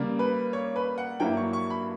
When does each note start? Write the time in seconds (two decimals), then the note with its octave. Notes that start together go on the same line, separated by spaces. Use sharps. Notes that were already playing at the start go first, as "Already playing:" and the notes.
Already playing: C#3 G3 A#3
0.19 B4
0.53 C#5
0.76 B4
0.98 F#5
1.20 G2 F#3 A#3 E4 G5
1.37 C#6
1.53 C#6
1.70 B5